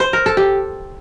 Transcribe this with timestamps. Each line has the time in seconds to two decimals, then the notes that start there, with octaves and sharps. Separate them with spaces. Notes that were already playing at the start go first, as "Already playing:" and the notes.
0.00 C5
0.13 A#4
0.26 A4
0.37 G4